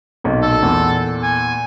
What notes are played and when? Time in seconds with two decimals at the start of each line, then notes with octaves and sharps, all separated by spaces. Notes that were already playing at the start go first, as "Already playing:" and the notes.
0.24 B1 A#2
0.42 A4
0.62 E2 A#2
1.23 G#5